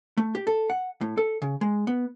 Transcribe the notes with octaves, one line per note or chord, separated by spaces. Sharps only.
A3
G4
A4
F#5
A2
A4
C#3
G#3
B3